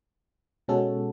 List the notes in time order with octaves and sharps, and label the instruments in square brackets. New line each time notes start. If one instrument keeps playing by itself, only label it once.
[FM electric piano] B2 G#3 C#4 F#4 A4